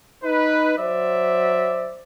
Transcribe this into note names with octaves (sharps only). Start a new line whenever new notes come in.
D#4 B4
F#3 C5 D5 E5